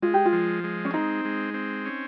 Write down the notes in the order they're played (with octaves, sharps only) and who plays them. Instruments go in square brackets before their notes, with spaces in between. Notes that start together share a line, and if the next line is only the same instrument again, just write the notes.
[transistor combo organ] G#3 [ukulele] F4
[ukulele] G4
F4
[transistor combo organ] F3
G#3
[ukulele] C#4
[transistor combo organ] C4 [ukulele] D#4
[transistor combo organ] G#3
C4
C#4